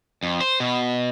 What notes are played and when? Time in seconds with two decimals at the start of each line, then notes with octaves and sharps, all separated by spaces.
0.23 F2
0.41 C5
0.60 B2